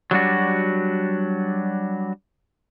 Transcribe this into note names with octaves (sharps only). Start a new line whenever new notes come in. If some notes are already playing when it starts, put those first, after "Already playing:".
F#3 G3 D4 F#4